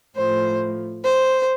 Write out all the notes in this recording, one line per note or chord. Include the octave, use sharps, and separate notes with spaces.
A2 F3 C5
C5